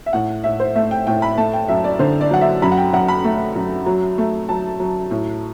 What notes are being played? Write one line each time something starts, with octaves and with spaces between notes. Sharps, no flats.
E5
A2 F#5
A2 E5
C5
A3 E5
G5
A2 G5
B5
A3 A5
G5
F#2 E5
D5
D3 C5
D5
F#3 F#5
E5
F#2 B5
F#5
G5
F#2 F#5
B5
A3
F#2
F#3
A3
F#3 A5
F#3
A2